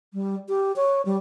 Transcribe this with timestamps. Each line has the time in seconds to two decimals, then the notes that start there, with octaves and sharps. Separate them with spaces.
0.14 G3
0.49 G4
0.76 C#5
1.06 G3